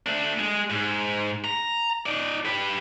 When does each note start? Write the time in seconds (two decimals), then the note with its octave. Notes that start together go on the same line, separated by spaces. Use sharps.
0.06 A3 D4
0.39 G#3
0.70 G#2
1.44 A#5
2.06 D#4 D5
2.45 G4 B4